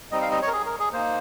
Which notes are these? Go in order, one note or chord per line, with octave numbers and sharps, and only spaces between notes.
G3 C4 D#4 D#5
F5
D#5
C#5
A#4
G#4
A#4
G#4
A#3 D#4 C5